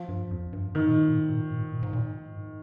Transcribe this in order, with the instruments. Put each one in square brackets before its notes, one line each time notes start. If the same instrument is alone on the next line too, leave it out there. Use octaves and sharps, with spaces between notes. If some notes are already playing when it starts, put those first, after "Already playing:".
Already playing: [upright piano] F3
[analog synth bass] G2
F2
G2
[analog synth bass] G#2 [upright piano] D#3
[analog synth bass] A#2
G#2
A#2
G#2
A#2
G#2
A#2
G#2
A#2
G#2
A#2
G#2